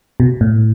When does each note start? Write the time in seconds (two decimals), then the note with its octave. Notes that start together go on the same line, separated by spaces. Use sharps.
0.20 B2
0.41 A2